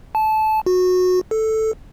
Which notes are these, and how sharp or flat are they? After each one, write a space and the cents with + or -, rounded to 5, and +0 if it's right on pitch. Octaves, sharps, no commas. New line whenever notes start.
A5 -20
F#4 -20
A4 +0